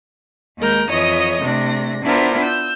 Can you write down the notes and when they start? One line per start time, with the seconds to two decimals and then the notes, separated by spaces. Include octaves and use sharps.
0.58 D#2 G#3 A#4 A#5 G6
0.91 F2 E3 C#5 D#5 D#6
1.43 C3 A3 D4 A#6
2.04 B3 D4 E4 F4 A#4 C5
2.43 E6 G6